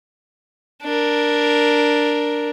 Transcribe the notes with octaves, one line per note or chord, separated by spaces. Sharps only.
D4 A#4